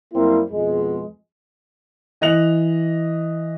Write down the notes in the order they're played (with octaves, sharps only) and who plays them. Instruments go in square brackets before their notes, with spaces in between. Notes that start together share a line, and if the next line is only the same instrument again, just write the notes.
[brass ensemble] F#2 G3 A#3 C4 E4
F2 B2 G#3
[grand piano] E3 D#5 F#6 F7 F#7